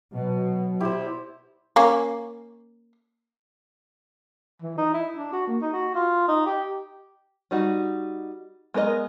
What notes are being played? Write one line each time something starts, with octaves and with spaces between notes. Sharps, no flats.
B2 F#3
E4 G4 C5
A#3 C#4
E3
D#4
E4
D4
F#4
A#3
D#4
F#4
F4
D#4
G4
G3 D#4 F#4
G#3 B3 A#4 B4 D#5